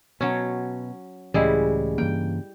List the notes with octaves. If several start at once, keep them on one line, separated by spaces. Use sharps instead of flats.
B2 F#3 C#4
C#2 A2 C#3 E3 G3 G#3 E4
G2 E3 A#3 G5